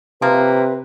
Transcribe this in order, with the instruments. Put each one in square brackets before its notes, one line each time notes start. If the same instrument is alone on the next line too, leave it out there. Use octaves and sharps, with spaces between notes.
[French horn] C3 [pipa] F3 A#3 [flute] B4